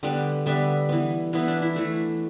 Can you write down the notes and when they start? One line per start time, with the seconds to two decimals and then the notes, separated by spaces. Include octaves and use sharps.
0.03 D3 G3 B3 G5
0.46 D3 G3 B3 E5
0.89 E3 B3
1.33 E3 B3 E4
1.47 D4
1.62 E4
1.76 E3 A3